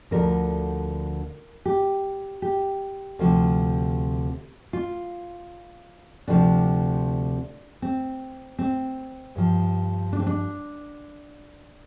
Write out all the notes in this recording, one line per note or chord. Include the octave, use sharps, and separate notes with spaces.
D2 D3 F3 A#4
G4
G4
D2 C3 F3
F4
D2 C3 F3 D4
C4
C4
G2 F3
D4
C4
D4